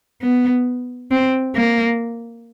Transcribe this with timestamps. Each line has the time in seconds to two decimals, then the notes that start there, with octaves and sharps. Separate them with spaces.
0.22 B3
1.11 C4
1.55 A#3